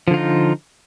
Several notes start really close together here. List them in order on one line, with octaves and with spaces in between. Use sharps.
F3 D3 F4 D#4